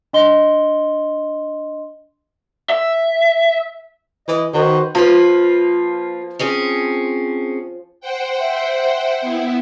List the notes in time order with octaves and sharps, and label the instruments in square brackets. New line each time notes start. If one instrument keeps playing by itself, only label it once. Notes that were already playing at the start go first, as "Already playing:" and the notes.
[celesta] D4 D#5 C6 G7
[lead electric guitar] E5
[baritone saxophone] E3 [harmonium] D#5
[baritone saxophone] D#3 [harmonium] F#4 B4 C5
[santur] F3 [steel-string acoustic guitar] A#3 F4 B4
[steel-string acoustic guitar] C4 C#4 G#4
[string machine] C5 F#5 G5
[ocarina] E5
[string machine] B3 E4